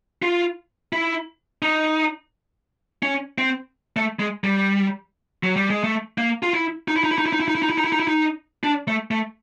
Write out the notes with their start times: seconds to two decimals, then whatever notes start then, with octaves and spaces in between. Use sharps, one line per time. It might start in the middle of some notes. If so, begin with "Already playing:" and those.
0.22 F4
0.93 E4
1.62 D#4
3.03 C#4
3.38 C4
3.96 A3
4.19 G#3
4.44 G3
5.43 F#3
5.56 G3
5.70 G#3
5.84 A3
6.18 A#3
6.43 F4
6.53 E4
6.88 D#4
6.96 E4
7.04 D#4
7.11 E4
7.18 D#4
7.26 E4
7.33 D#4
7.40 E4
7.48 D#4
7.55 E4
7.62 D#4
7.70 E4
7.78 D#4
7.85 E4
7.92 D#4
8.00 E4
8.08 D#4
8.63 D4
8.88 A3
9.11 A3